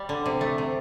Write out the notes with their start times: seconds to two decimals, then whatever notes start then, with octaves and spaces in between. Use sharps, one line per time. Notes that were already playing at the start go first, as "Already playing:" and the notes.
Already playing: G3
0.09 D3
0.26 C3
0.41 A3
0.58 C3